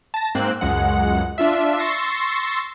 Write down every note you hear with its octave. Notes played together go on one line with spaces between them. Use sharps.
A5 A#6
G#2 A#3 C4 F#6
C#2 F#2 G#3 F#5
D4 F4 E5
C6 C#6 E6 A6 A#6 C7